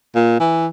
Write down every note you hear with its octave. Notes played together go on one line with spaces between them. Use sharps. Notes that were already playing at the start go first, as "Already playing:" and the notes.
A#2
E3